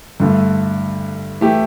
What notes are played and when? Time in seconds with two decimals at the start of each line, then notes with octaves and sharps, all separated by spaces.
0.20 G2 D3 A3
1.41 E3 A3 E4 G4